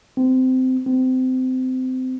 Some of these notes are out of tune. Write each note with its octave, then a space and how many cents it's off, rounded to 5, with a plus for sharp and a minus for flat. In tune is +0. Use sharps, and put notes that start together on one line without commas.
C4 -20
C4 -25